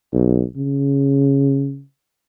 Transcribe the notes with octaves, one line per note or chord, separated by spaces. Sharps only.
B1
C#3